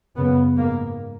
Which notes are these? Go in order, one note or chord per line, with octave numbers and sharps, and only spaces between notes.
F#2 C#3 B3
G#2 A#3